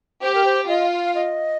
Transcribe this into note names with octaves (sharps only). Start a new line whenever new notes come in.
G4 C5
A#4
C5
F4 D#5
F5
D#5